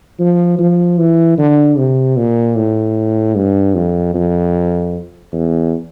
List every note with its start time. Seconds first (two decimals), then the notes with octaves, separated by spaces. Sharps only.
0.20 F3
0.59 F3
0.98 E3
1.38 D3
1.78 C3
2.17 A#2
2.56 A2
3.36 G2
3.75 F2
4.15 F2
5.33 E2